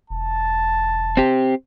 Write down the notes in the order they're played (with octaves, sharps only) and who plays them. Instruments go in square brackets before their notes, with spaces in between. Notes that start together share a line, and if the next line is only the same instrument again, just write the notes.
[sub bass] E1 [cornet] A5
[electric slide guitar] C4 G4